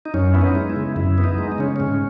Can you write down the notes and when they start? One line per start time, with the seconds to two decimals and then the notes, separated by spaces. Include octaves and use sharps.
0.06 D#4
0.14 F#2 C#4
0.33 B3 E4
0.41 D#4
0.55 G#3
0.70 E4
0.76 C#3
0.96 F#2 E4
1.18 B3
1.24 D#4
1.38 G#3
1.52 D#4
1.58 C#3 C#4
1.76 G#2 C#4